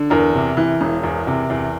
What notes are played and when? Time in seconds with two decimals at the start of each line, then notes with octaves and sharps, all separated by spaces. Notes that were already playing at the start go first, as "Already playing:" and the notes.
Already playing: D3
0.10 E2 A#4
0.35 C3
0.57 E3
0.81 E1
1.04 E2
1.27 C3
1.50 E2